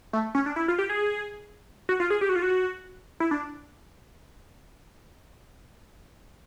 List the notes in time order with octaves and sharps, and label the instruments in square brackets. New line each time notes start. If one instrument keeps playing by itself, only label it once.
[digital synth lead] A3
C#4
D4
E4
F4
G4
G#4
F#4
F4
G#4
G4
F#4
F4
F#4
E4
D4